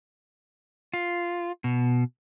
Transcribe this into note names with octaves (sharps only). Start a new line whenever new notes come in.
F4
B2